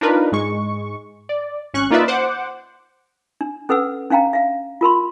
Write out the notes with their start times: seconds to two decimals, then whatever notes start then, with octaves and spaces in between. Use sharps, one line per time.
0.01 D4 D#4 F4 A#4 B4
0.32 G#2 G#3 C#6
1.29 D5
1.74 G#1 C#4 C#6 F#6
1.91 A#3 D#4 F4 B4 D5 E5
2.08 C5 F#5 D6
3.41 D4
3.69 C#4 A4 B4 F#5 E6
4.10 C#4 D4 F5 G5 A#5
4.33 E5 F5
4.81 F4 A#4 B5 C6